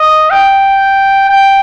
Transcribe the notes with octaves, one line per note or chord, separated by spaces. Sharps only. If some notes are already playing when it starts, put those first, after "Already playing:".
Already playing: D#5
G5
G5